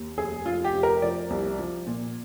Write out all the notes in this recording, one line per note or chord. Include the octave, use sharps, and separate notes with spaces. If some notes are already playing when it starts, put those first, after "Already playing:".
Already playing: D#2
F1 G#4
F1 F4
G4
F1
A#4
F3 D5
C2
F3
A#2